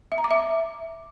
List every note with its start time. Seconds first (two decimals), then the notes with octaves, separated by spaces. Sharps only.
0.12 E5
0.18 A#5
0.24 D6
0.31 E5